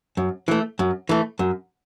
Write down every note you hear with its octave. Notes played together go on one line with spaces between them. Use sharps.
F#2
E3 A3
F#2
E3 A3
F#2